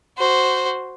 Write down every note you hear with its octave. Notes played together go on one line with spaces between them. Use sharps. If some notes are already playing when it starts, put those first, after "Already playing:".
F#4 C5